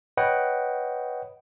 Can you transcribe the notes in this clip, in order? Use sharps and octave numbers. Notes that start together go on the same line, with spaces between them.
B4 C#5 D#5 F#5 G5